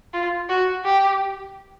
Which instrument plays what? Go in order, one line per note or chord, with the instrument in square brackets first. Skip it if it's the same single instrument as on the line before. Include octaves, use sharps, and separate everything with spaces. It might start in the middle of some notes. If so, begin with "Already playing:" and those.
[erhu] F4
F#4
G4